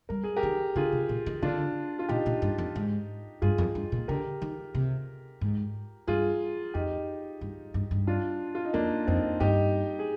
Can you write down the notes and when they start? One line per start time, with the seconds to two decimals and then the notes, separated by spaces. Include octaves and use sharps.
0.09 G3 A#4
0.24 G#4
0.36 G4 A#4
0.43 D#3
0.76 D3 F4 G#4
0.93 C3
1.09 A#2
1.26 D#3
1.42 D3 D4 F4
1.99 F4
2.08 A#2 D#4 G4
2.26 A#2
2.42 G2
2.58 F2
2.76 G#2
3.42 G2 F4 G#4
3.58 F2
3.75 G2
3.92 A#2
4.08 D3 G4 A#4
4.42 D#3
4.75 C3
5.41 G#2
6.07 G2 F4 G#4
6.74 F2 D#4 G4
7.41 G2
7.74 G2
7.91 G2
8.07 D4 F4
8.55 F4
8.65 D#4
8.74 F2 A#3 D4
9.07 F2 C4 D#4
9.40 G2 D#4 G4
9.99 G#4